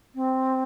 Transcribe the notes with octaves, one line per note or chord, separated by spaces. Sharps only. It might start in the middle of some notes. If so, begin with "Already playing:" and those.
C4